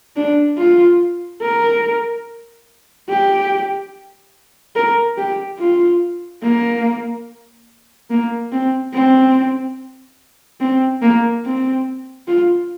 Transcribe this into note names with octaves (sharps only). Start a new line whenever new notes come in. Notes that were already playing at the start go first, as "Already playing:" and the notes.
D4
F4
A#4
G4
A#4
G4
F4
A#3
A#3
C4
C4
C4
A#3
C4
F4